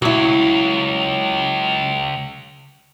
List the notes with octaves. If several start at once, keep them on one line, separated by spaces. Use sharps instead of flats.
C#2 F#3 E4